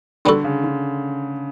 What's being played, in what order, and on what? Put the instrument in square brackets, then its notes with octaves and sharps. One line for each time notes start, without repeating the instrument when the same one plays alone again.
[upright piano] D3 [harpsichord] G3 B3 F#4 A4
[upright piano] C#3
D3